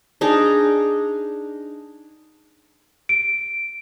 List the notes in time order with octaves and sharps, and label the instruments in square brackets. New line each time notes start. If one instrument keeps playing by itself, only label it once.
[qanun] D4 D#4 G#4 A#5
[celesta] D7